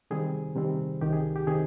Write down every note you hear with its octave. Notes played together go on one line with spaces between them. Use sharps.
C3 D#3 G3 C4 G#4
C3 D#3 G3 C4
C2 C3 D#3 G4
G#4
G4
C3 D#3 G#4